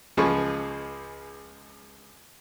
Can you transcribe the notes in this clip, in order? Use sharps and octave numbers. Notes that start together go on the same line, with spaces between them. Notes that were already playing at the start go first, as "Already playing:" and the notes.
C#2 F3 G#3 G#4 B4 C#6